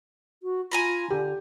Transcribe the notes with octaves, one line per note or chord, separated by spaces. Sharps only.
F#4
F4 G#5 A#5 B5
D3 G4